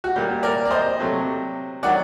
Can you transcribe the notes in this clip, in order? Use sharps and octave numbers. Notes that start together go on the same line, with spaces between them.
F#4
A#2 G3 A#3 G4
A#4 D5
D5
C5 D#5
C3 F#3 A3
D#3 F#3 A#3 D5 F#5